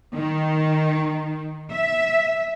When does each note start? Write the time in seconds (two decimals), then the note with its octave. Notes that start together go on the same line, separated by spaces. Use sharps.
0.16 D#3
1.73 E5